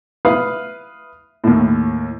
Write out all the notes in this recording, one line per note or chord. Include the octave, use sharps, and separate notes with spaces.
E4 B4 F5 D#6
D#2 A2